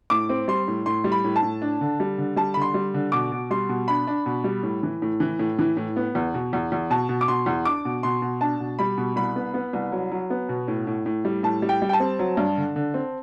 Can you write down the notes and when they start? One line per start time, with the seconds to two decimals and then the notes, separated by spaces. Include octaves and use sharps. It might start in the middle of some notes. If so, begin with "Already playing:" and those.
0.10 A2 D6
0.29 C4
0.48 G3 C6
0.68 A2
0.86 A2 C6
1.04 G3
1.12 B5
1.24 A2
1.36 A5
1.43 A2
1.62 D4
1.81 D3
2.00 G3
2.18 D3
2.36 G3 A5
2.54 D3 B5
2.62 C6
2.74 G3
2.94 D3
3.12 B2 D6
3.32 B2
3.51 G3 C6
3.69 B2
3.88 D4 B5
4.07 D4
4.26 B2
4.44 G3
4.63 A2
4.83 E3
5.02 A2
5.20 E3
5.39 A2
5.59 E3
5.77 A2
5.96 B3
6.15 E2
6.34 B2
6.53 E2
6.72 E2
6.90 B2 A5
7.09 B2
7.21 D6
7.28 B2 C6
7.46 E2
7.65 D4 D6
7.85 B2
8.03 B2 C6
8.22 B2
8.41 D4 A5
8.60 B2
8.79 G3 B5
8.98 B2
9.16 C2 B5
9.36 B3
9.54 B3
9.73 C2
9.92 F#3
10.11 F#3
10.30 B3
10.49 B2
10.68 A2
10.87 A2
11.06 A2
11.25 G3
11.43 A2 A5
11.62 G3
11.69 G5
11.82 G3
11.89 G5
11.93 A5
12.00 C4
12.19 F#3
12.37 G2
12.57 D3
12.76 D3
12.94 C4